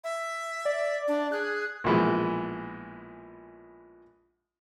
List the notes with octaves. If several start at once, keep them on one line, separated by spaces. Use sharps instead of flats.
E5
D5
D4
G#4 F#6
A#1 B2 E3 F3 G#3